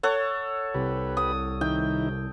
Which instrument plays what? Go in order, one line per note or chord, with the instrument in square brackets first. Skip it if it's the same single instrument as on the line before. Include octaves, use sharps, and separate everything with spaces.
[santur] A4 C#5 F#5
[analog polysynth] C2 [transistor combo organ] G4 B4
[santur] D#6
[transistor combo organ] D#3 D#4 E4 [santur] G5